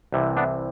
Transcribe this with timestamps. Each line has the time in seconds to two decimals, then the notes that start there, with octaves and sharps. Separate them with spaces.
0.12 C2 C3 E3
0.37 B3 D4